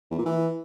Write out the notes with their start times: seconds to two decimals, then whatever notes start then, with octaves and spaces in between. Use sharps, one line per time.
0.11 E2
0.19 A#2
0.26 E3